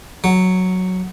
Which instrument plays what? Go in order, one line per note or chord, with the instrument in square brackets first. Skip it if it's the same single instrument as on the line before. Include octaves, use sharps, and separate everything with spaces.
[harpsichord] F#3